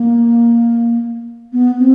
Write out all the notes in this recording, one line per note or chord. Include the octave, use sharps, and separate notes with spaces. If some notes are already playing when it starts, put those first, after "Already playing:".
Already playing: A#3
B3
C4